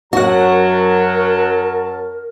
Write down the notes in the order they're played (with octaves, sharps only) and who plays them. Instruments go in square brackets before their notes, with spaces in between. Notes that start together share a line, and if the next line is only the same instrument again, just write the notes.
[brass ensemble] F#2 F#3 A5 [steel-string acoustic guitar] F#4 F#5 [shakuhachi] A#4